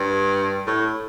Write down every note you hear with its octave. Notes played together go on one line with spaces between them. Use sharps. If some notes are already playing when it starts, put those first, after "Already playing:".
Already playing: G2
A2